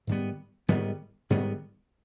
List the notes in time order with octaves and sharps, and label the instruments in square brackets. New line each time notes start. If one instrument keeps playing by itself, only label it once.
[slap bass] G#2 D#3 G3 B3
G#2 D#3 G3 B3
G#2 D#3 G3 B3